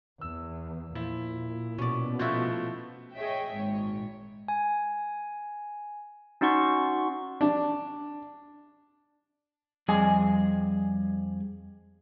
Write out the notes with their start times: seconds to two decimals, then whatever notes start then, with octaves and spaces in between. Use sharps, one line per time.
0.21 E2 E6
0.95 A#2 F3 E4
1.78 B2 C#4 D5
2.19 F3 A3 E4 F#4 C5
3.15 G#4 C#5 D#5 E5 G5
3.52 G#1 A#2 C#5
4.48 G#5
6.41 C#4 D#4 F#4 F#5 C6 C#6
7.41 D4
9.88 F2 G3 G#4 D#5 G#5